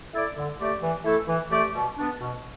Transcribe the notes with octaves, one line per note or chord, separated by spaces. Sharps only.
E4 A4 D5
D3
A3 G4 D5
E3
A3 E4 A4
E3
A3 G4 D5
B2
B3 D4
B2